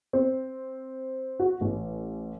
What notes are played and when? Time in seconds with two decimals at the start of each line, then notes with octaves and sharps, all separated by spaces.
0.13 C4
1.40 F#4
1.61 A1